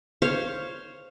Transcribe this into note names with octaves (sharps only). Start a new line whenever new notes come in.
C5 C#5 F5